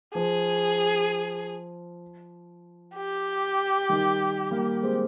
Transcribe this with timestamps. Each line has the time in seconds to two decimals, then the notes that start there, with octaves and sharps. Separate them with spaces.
0.15 F3 G#4
2.95 G4
3.89 D#3 G3
4.51 G3 A#3
4.83 G#3 C4